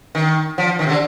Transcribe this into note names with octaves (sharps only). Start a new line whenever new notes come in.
D#3
F3
D#3
C3
D3